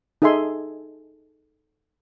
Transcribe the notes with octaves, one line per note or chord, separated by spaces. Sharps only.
D#4 G#4 A4 E5 G#5 C6